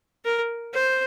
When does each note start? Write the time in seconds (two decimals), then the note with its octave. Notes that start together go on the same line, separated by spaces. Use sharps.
0.25 A#4
0.74 C5